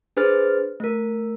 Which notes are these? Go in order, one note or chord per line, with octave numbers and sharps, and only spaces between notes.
D4 G#4 B4 C5 F6 A6
A3 A#4